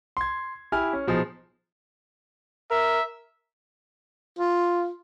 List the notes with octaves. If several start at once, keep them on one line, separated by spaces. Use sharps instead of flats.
C6 G#6
E4 G4 G#5 F6
C#4
B2 F3 D#4 G#4
A#4 E5
F4